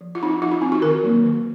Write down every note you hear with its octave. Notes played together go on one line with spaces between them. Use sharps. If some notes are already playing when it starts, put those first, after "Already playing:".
F3
F4
C4 D#4
F4
F3 F4
D#4
C4 F4
F#4
D#3 A#4
F#3 A#3
D#3